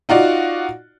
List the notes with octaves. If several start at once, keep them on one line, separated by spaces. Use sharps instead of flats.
D#4 F4 F#4 D5